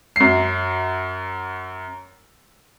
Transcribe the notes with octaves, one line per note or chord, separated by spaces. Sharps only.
F#2 C7